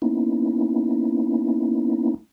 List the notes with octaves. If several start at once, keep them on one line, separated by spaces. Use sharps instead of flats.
A#3 B3 C#4 D#4 E4